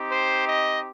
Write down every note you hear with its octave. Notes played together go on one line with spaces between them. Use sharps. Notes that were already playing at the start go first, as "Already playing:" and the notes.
Already playing: C4 D#4 G4
C5
D#5